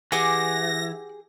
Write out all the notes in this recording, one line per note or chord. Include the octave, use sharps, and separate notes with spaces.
E3 G4 G#4 F#5 G#5 D6 A#6